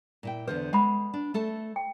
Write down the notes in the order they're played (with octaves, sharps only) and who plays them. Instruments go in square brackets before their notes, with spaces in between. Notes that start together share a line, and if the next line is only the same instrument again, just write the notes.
[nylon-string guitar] A#2 E4 G5
[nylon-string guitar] E2 D3 C5 [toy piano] B4
[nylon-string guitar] G#3 [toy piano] F#5 B5
[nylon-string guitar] D4
A3 A4 A5
[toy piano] G5